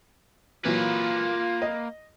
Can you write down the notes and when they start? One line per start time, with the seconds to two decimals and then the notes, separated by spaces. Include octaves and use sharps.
0.65 A#2 E3 F#3 A#3 F4 B4
1.62 D#5